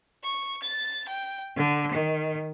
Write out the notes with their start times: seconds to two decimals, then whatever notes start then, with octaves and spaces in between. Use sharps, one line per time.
0.23 C#6
0.62 A6
1.08 G5
1.55 D3
1.90 D#3